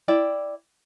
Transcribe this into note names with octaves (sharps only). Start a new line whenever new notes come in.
E4 D5 G5